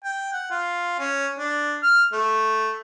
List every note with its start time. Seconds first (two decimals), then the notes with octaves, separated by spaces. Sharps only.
0.04 G5
0.33 F#5
0.51 F4
0.99 C#4
1.39 D4
1.83 F6
2.13 A3